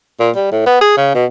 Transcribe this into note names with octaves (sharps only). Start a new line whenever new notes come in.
A#2
G3
A2
B3
G#4
C#3
B2